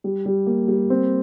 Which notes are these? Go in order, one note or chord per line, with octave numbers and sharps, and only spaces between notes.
G3
G3
A#3
G3
C4